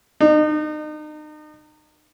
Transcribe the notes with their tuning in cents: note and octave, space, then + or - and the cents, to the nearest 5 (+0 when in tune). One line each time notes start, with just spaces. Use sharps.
D#4 -35